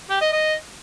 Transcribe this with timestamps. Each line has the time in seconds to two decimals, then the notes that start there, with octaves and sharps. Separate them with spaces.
0.09 G4
0.21 D#5
0.32 D#5